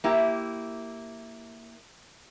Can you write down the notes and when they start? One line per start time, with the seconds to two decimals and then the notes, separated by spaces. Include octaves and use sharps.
0.04 A#3 E4 G4